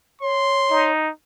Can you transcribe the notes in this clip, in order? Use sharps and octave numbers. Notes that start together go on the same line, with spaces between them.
C#5 C6
D#4